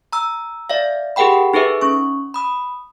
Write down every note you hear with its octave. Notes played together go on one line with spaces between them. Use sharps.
A#5 E6
D5 E5 F5
G4 G#4 A#4 F#5 G5 B5
D#4 G#4 A4 B4 E5
C#4 C#6
B5 D#6